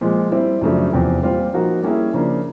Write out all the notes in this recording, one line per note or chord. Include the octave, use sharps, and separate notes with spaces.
A#2 F3 G#3
G3 C4 E4
F#2 C#3 F3 A3 D4
E2 C3 F3
A#2 G3 C4 F4
A#2 F3 A#3 D#4 F#4
G3 A#3 C#4 E4 G#4
C#3 F3 A#3 D4